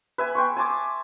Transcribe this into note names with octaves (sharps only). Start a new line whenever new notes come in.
B4 E5 G#5
G5 C6 C#6
G#5 A5 C6 D6